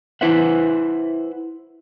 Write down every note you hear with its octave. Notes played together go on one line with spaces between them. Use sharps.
E4 B4 C5 E5 F#5